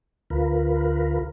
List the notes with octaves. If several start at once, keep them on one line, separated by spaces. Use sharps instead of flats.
D2 F4 A#4 B4